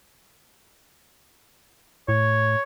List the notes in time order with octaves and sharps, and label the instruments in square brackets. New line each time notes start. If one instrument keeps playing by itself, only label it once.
[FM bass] A2 [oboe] C#5